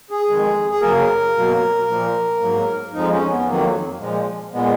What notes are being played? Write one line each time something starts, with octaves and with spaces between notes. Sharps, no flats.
G#4
F2 D#3 G#3
G#4
F#2 C#3 F#3 A#3 A#4
B2 F#3 A#3
A#2 F3 A#3
G#2 F#3 A#3
F2 F3 G#3 D#4
C#4
B3
F2 D#3 F#3 A#3
A#2 F3 G#3
A#2 G#3 B3